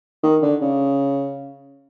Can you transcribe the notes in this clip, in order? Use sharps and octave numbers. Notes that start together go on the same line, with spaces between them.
D#3
D3
C#3